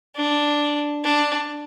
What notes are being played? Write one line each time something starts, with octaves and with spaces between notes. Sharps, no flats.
D4
D4